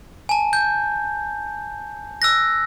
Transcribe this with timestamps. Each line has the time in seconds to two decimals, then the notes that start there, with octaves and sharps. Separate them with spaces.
0.29 G#5 A5
0.53 G6
2.22 E6 F#6 A#6